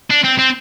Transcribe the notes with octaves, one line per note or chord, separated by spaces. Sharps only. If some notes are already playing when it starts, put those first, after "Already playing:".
D4
C4
C4